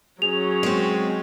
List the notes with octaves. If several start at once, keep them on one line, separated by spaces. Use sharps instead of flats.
F#3 C#4 G#4 F7
G#3 C4